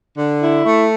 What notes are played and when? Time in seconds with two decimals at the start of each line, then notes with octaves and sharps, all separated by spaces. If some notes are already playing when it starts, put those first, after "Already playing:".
0.17 D3
0.41 E4
0.65 A3